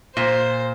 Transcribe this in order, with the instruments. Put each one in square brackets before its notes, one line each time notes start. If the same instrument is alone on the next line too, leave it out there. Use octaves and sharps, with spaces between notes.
[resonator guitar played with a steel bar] A#2 [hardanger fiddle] C5